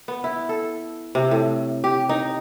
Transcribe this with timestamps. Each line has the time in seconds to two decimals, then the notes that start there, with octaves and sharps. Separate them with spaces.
0.08 B3
0.24 E4
0.49 A4
1.15 C3
1.31 A2
1.84 G4
2.09 D#4